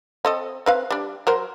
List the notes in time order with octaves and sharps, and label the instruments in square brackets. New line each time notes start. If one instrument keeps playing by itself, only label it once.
[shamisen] C4 A4 D#5
C4 B4 F5
G3 D4
F#3 A#4 C5